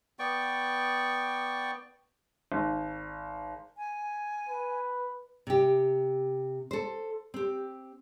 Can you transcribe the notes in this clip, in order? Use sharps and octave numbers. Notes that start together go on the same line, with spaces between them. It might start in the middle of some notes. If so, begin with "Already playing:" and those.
B3 D5 G5 C#6
G#1
G#5
B4
C3 G4
A4 C5
C4 G4